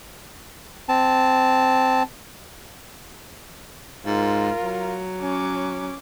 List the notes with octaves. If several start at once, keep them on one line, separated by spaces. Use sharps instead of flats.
C4 A5
G#2 F4 A#4
F#3
C#4 D6